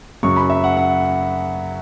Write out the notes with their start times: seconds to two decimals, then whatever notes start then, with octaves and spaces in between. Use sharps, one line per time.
0.23 F#2 C#3 F#3 C#6
0.37 B5
0.50 E5
0.64 F#5
0.77 F#5